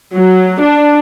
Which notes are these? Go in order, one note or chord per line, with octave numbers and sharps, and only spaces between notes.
F#3
D4